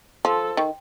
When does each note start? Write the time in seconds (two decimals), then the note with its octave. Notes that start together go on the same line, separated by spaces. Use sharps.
0.25 F3 A4
0.57 D#3